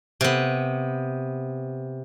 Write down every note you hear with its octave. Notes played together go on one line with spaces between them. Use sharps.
C3 B3